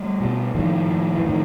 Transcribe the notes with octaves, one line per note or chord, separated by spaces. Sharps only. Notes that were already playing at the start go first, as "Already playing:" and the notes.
Already playing: G3 A3
B2
A2 D#3 F3
A2
E3
A2 D#3 F3